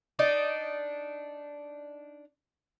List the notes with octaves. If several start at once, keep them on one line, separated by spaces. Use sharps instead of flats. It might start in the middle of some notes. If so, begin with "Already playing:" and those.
D4 D#4 D5